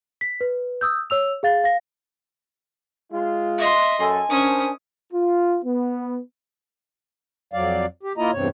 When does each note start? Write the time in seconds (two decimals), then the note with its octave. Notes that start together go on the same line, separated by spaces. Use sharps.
0.21 B6
0.41 B4
0.81 D#6 E6 G6
1.10 C#5 E6 F7
1.43 G#4 F5 A6
1.64 F5 A#6
3.12 G#3 F4
3.58 D#5 E5 C6
4.00 F#2 A4 G#5
4.30 C#4 D4 A#4 C5 D#6
5.13 F4
5.65 B3
7.53 F2 F#3 D5 F5
8.03 G4
8.18 A#3 E4 F4 D#5 A#5
8.33 E2 G2 C3 C#5